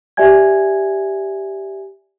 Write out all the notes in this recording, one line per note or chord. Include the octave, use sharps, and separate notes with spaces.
G4 D5 E5 G#5 G#6